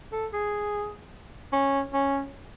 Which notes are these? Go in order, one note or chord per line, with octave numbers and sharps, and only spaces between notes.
A4
G#4
C#4
C#4